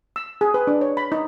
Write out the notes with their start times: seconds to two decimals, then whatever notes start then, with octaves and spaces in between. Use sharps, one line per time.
0.16 E6
0.41 G#4
0.54 B4
0.67 D4
0.81 C#5
0.97 B5
1.12 D#4